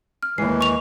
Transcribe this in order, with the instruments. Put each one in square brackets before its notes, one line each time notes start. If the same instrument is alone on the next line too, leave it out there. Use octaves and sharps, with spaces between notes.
[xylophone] F6
[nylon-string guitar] D#2 G#3 [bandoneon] E3 [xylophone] C7
[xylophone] C#6 F7